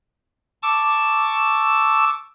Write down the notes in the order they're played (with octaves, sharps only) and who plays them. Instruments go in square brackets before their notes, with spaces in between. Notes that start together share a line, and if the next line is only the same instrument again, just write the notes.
[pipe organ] A5 C#6 D6 E6